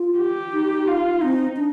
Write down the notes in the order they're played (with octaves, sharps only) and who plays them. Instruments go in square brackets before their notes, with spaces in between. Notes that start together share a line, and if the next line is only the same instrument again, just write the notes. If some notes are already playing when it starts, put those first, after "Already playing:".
Already playing: [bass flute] F4
[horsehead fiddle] G4
[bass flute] D#4
[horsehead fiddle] F4
[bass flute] C4 [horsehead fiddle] D#4
[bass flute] D4